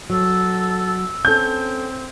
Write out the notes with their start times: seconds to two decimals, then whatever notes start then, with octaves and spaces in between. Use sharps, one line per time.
0.10 F#3 A4 E6
1.25 C4 C#4 A4 G6